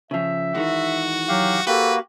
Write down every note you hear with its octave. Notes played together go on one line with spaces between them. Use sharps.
C#3 F3 E5
D#3 E3 G#3 F#4
F#3 G4 F5
A#3 F#4 G4 A4 B4